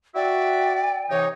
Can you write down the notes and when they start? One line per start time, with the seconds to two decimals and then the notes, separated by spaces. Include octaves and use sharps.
0.15 F#4 D5 E5 G5
1.11 C3 E3 D#4 C#5